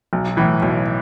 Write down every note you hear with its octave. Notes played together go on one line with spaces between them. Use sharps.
B1
A2 E3
B1